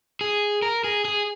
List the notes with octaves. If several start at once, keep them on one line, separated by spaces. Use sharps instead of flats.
G#4
A#4
G#4
G#4